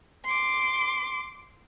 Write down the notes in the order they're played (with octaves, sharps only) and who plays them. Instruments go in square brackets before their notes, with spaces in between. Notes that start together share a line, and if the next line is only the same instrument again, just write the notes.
[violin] C6 D6